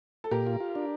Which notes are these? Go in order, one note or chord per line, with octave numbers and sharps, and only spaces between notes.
A4
A#2 G4 A#4
F4
F4
D4